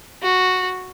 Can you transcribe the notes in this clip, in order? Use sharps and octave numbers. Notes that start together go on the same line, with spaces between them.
F#4